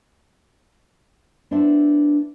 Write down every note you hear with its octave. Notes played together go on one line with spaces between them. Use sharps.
B3 D4 E4 C5 E5